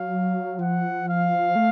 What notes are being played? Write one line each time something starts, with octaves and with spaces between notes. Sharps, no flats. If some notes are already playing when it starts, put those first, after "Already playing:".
Already playing: F#3 F5
F3 F#5
F5
A3